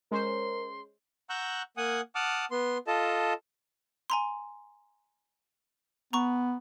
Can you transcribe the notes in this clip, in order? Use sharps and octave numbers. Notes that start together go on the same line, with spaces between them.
G#3 C#4 A#4 C5 C6
F#5 A#5 C#6 E6 F#6 G6
A#3 F#5 G#5 D#6
F#5 A5 D6 D#6 F6
B3 C6
F4 A4 D#5 A5
G#5 A#5 C6
B3 A#5 C#6